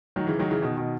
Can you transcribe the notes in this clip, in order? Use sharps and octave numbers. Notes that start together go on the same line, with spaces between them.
D#3 F#3
C#3 E3
D#3 F#3
C#3 E3
B2 D#3
B2 D#3